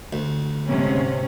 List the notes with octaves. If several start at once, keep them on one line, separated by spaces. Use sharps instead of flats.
D2
G#2 C3 C#4